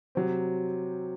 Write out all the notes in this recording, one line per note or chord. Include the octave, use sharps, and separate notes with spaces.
C3 F#3 C4